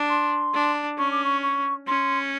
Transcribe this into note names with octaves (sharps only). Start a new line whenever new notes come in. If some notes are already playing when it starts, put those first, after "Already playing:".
Already playing: D4
C6
D4
C#4 C#6
D6
C#6
C#6
C#4 C6